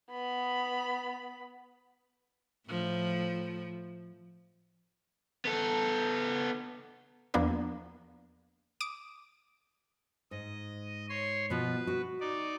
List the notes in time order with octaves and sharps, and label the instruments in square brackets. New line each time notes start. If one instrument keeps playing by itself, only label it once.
[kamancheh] B3 B5
[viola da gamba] A2 F3
[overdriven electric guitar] B3 A4
[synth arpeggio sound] E2 F3 A#3 B3 D4 A#4
D6 D#6 D7
[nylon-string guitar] G#2 [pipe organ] D#5
[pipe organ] C#5 C6
[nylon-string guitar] B2 F3 [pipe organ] B4
[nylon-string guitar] F#4
[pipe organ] D#4 D5